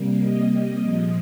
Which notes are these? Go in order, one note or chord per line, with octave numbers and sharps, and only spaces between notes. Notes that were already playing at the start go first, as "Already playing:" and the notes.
Already playing: C3 G3 A#3
D#5
A#2 F3 G#3